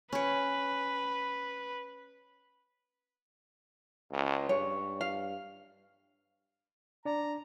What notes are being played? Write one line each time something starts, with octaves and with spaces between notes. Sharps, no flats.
C#4 B4 C#5
C#2
G2 C#5
F5
D4 D5 A#5